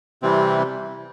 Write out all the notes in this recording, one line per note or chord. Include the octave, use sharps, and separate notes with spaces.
C3 E3 G3 C4